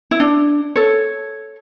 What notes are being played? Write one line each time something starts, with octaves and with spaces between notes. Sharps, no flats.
E4
D4
A4 C#5